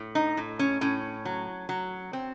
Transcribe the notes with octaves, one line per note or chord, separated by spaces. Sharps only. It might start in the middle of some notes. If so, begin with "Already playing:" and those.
Already playing: A2
D#4
A2
C#4
A2 C#4
F#3
F#3
C4